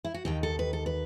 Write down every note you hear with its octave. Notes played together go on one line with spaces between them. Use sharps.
E4
F#4
D#2 D#3 G4
A4
B4
A4
B4